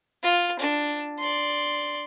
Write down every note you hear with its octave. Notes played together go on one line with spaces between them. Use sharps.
F4
D4
D5 C6